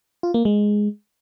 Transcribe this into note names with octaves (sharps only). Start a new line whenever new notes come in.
F4
A#3
G#3